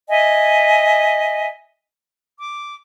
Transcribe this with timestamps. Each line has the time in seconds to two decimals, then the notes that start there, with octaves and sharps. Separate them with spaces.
0.09 D#5 E5 G#5
2.39 D6